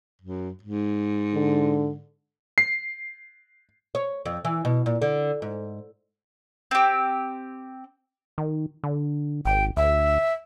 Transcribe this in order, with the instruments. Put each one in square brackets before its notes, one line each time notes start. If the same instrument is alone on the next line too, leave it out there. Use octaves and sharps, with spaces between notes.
[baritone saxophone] F#2
G#2
[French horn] D3
[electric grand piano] C7
[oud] C#5
F2
E3
B2
A#2
D3
G#2
[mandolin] C4 G4
[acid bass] D#3
D3
[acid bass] G#1 [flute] G5
[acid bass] D2 [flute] E5